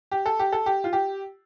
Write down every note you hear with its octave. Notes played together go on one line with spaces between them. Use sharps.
G4
A4
G4
A4
G4
F4
G4